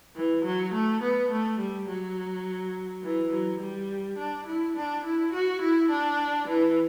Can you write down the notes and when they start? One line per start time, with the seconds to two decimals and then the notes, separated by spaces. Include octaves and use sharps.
0.16 E3
0.45 F#3
0.73 A3
1.03 B3
1.31 A3
1.59 G3
1.89 F#3
3.03 E3
3.32 F#3
3.60 G3
4.18 D4
4.47 E4
4.76 D4
5.04 E4
5.33 F#4
5.62 E4
5.91 D4
6.48 E3